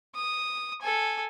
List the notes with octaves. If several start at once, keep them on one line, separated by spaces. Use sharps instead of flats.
D#6
A4 G#5